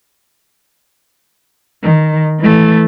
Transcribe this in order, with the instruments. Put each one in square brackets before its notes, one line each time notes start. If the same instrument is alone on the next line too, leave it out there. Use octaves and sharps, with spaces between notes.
[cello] D#3
E3 A3